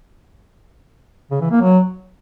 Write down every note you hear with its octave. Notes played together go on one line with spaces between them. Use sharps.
C#3
E3
A#3
F#3